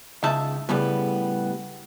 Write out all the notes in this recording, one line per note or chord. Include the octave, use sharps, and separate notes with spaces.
C#2 C#3 D#4 E5 A5
A2 C#3 G3 B3